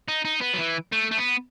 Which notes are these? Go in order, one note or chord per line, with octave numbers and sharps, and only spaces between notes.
D#4
D#4
B3
F#3
E3
A3
A3
B3